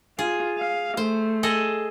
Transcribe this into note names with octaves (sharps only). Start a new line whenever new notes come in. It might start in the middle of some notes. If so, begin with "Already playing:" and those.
F4 G#4
F5
A3 C5
G#4 A4 D#5